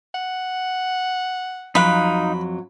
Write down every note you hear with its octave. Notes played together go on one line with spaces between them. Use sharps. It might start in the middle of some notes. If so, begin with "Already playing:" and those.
F#5
F2 F#3 D#4 F5 B5 F#6